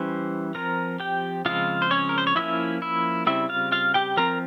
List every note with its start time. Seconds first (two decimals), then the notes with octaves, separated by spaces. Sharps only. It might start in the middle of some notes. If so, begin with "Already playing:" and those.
Already playing: E3 G3 C#4 C5
0.55 F3 C4 A#4 A#5
1.00 G4 G5
1.45 C#3 F3 G#3 C4 F4 F5
1.82 C5
1.91 C#4 C#5
2.09 A#4
2.18 C5
2.27 C#5
2.36 F3 A#3 C#4 E4 E5
2.82 E4 E5
3.27 C#3 G3 C4 E4 E5
3.49 F4 F5
3.72 F4 F5
3.94 G4 G5
4.17 F3 C4 A#4 A#5